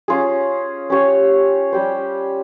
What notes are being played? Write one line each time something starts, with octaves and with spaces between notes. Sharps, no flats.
C#4 F4 G#4
C#4 G4 C#5 F5
G3 C#4 G4 C5